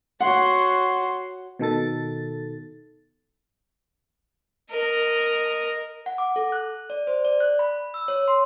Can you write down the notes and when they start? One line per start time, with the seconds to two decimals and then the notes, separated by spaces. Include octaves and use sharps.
0.21 F#4 C#5 F#5 C6
1.59 B2 D#3 A4 A6
4.71 A#4 D#5
6.06 F#5
6.18 D6
6.36 A4
6.52 F#6
6.90 D5
7.07 C5
7.25 D5
7.40 F#6
7.59 B5
7.94 E6
8.08 C#5
8.28 C6